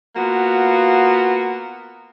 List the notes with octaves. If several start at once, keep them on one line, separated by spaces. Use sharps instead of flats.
A#3 B3 F4 F#4